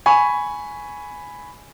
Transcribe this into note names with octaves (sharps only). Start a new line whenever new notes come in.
G#5 B5 C#6